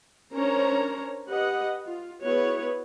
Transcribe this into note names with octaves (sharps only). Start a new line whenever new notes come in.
C#4 D4 A#4 C5 C#5 A#5
G4 B4 D#5 F#5
F4
B3 E4 F#4 G#4 B4 C#5